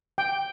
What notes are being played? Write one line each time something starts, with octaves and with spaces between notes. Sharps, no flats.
G5